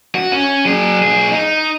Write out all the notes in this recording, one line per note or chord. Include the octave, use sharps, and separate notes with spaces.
F#4
C#4
F#3 G#4
B1 G#4
D#4